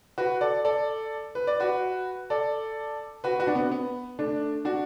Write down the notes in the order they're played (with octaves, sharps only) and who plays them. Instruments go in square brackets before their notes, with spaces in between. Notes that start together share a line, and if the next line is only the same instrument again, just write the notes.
[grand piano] F#4 B4
A4 D5
A4 D5
B4
D5
F#4 B4
A4 D5
F#4 B4
F#4 B4
D4
B3
B3
A3 D4
D4 F#4